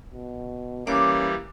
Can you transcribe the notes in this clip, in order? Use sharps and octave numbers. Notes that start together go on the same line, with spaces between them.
B2
E3 G3 A#3 C#4 D6